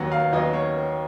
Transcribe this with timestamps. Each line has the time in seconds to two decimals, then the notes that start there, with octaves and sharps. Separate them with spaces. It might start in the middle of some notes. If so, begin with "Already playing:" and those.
Already playing: D#2 D#3 F#3 F#5
0.12 F5
0.32 D#2 D#3 F#3 D#5
0.53 C#5